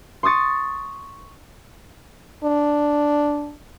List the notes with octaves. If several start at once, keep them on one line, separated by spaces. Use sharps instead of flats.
C6 C#6 D#6 A6 C#7
D4